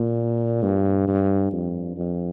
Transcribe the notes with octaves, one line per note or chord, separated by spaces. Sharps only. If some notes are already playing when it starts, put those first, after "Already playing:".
Already playing: A#2
G2
G2
F2
F2